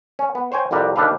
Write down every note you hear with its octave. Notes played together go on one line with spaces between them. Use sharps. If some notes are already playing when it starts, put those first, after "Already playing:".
C#4
B3
C5 C#5 G5 G#5
C2 F2 G3 B4 A#5
D#2 D4 G4 A4 B4 F5